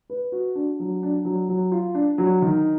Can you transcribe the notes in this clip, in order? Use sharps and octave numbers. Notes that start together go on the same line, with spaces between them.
B4
F#4
D4
F#3
D4
F#3
F#3
F4
D4
F#3
D#3